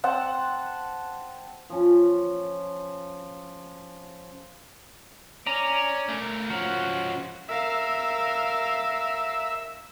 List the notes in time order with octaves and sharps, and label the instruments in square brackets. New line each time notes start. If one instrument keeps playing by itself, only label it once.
[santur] C4 F#5 A5
[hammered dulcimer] F3 C#4
[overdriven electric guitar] C#4 [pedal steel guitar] D5 A#5
[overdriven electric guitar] A3 A#4
[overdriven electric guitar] F3 C#4 [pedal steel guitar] F#4
[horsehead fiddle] A#4 F5 [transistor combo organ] E5